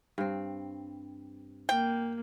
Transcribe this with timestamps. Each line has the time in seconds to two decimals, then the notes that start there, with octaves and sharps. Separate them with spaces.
0.18 G2 C4
1.69 A#3 G5